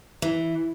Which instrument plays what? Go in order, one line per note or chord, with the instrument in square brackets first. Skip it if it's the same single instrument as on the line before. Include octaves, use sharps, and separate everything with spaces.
[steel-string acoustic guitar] E3